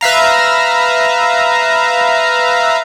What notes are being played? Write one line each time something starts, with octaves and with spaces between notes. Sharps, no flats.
B4 E5 F5 A#5